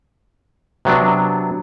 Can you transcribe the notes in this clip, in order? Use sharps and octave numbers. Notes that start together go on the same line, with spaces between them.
C3 F#3 B3 D4